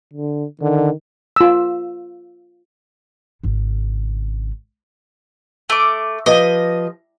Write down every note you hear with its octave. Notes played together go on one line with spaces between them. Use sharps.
D3
D3 D#3
F4 E6
G#1 C#3
A3 D6
F3 G4 B4 D#5